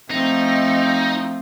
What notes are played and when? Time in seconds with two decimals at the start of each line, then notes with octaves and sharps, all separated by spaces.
0.11 F3 A3 C4 D#4